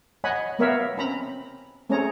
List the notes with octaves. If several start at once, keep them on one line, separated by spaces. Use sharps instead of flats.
C#5 D#5 F#5 G#5 B5
A#3 B3 A#4 C#5 E5 F5
C4 C#4 A#5 B5
A3 C4 C#4 G#4 C#5 A#5